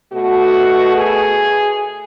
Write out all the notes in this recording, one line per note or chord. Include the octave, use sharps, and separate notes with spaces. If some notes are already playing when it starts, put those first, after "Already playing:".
B2 A3 F#4
G#4